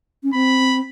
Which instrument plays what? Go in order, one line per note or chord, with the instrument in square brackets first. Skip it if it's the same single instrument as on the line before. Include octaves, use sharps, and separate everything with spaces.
[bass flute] C#4
[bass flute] C4 [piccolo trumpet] B5